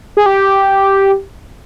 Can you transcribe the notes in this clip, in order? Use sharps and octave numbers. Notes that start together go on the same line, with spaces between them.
G#4
G4